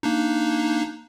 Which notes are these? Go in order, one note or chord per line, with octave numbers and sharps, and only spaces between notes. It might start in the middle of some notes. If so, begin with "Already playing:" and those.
A#3 D4 D#4